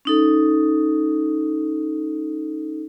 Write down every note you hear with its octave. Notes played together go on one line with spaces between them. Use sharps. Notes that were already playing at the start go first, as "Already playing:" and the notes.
C#4 D#4 A4